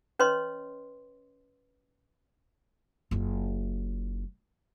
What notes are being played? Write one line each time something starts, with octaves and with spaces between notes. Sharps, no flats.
C#4 B4 C#5 D#5 C6
F#1 F4